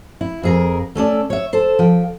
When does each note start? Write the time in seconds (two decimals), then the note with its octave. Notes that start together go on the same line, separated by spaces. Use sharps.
0.21 E4
0.43 F2 G#4 A#4
0.95 A3 C#4 A4 D5
1.30 C#5 E5
1.53 A4 C5
1.79 F3 G5